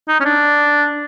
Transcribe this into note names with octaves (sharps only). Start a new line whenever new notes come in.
D#4
C#4
D4